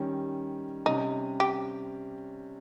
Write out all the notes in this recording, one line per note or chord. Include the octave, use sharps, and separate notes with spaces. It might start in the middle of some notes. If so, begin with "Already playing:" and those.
Already playing: D#3 G3 C#4
C3 G3 C#4 D#4
G4